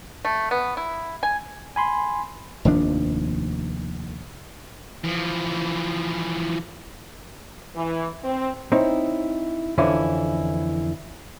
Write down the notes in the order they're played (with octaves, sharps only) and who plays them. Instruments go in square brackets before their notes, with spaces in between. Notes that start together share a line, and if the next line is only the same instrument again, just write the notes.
[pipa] A3
B3
E4
G#5
[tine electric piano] G#5 B5 C6
[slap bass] F1 D#2 F3 D4
[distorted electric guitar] E3 F3
[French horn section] E3
C4
[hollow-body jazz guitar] C4 D#4 E4 C#5
F2 D3 E3 C#4 E4